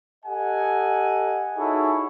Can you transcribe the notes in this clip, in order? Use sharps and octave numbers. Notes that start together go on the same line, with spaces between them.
G4 A4 D#5 F#5 G#5
D#4 E4 F#4 G#4 A4 C#5